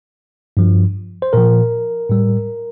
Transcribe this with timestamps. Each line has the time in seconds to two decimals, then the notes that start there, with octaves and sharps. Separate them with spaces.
0.57 G2 F3
1.22 C5
1.33 A#2 F3 A#4
2.09 A2 G3